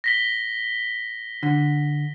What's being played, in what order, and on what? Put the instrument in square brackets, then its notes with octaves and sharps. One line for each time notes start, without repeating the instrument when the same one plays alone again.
[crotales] A#6 B6 G7
[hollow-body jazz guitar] D3